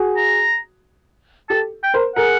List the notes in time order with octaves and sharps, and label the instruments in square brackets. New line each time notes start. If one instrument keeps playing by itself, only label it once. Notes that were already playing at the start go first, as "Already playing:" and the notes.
Already playing: [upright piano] F#4 G#4
[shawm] A#5
[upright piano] G4 A4 [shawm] A5
[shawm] G5
[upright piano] A#4 C5
[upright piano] G#4 A#4 [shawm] F#5